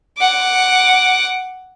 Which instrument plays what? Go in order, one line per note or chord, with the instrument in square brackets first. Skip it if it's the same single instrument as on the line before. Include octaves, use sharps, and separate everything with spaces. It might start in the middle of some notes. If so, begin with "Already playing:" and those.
[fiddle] F#5 D6